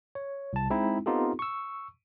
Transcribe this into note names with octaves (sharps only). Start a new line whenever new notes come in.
C#5
C2 A5
G#3 C4 D#4 E4
B3 C4 D#4 F4 G4 A4
C#6 E6